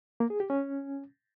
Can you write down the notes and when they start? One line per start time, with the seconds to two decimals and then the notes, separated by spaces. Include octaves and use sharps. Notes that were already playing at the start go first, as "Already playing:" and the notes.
0.20 A#3
0.30 G#4
0.40 G4
0.50 C#4